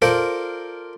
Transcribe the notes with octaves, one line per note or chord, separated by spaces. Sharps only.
F4 A4 A#4 C5 D5